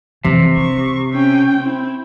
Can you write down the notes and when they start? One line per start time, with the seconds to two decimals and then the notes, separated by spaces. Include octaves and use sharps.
0.25 C3 E3
0.57 D4 C#6
1.13 C#4 G5
1.61 C4 E4